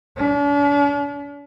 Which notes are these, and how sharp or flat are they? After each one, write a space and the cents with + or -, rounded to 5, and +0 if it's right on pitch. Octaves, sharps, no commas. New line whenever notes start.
D4 -45